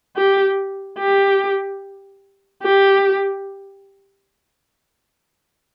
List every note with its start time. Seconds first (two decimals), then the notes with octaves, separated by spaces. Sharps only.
0.16 G4
0.98 G4
2.63 G4